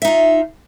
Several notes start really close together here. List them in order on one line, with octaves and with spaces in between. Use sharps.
E5 D#4 F4